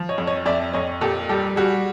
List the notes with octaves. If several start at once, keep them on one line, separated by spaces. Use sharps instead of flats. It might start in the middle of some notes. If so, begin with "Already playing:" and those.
Already playing: F3
C#5 D#5
F2
C#5 D#5
F2 D5 E5
F2 C#5 D#5
A#2 G4 A4
G3 G4 A4
G3 F#4 G#4